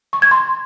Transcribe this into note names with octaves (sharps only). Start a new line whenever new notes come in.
C#6
G#6
C6